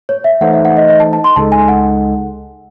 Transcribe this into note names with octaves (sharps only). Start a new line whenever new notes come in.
C#5
E5
E3 A3 D#4 A4 C5 F#5
E5
F#5
D#5
D#5
A5
A5
C6
C#2 C#3 G#3 D#4 A4 A5
G#5
F#5